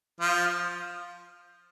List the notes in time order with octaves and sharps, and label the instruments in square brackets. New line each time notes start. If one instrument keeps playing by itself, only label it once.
[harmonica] F3 F4